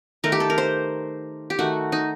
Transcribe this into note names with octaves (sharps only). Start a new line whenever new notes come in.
D#3 A3 A#4
G4
A4
A#4
C5
G4
D#3 A3 F#4
D#4